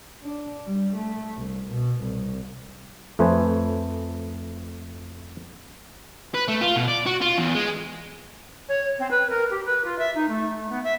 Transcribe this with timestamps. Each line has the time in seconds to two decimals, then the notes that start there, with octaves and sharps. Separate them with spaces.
0.23 D4
0.66 G3
0.96 A3
1.35 C2
1.69 B2
2.02 C2
3.19 F2 A3 B4 C5 G#5
6.34 B4
6.48 A3
6.61 F4
6.76 B2
6.88 D5
7.06 F#4
7.21 F4
7.38 E2
7.55 G#3
8.68 C#5
8.99 C4
9.10 B4
9.29 A#4
9.50 G4
9.65 B4
9.84 F4
9.98 E5
10.15 D#4
10.28 A3
10.69 B3
10.83 E5